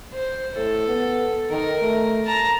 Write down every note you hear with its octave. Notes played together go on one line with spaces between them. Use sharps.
C5
A2 A4
B3
D#3 A#4
A3
A5 A#5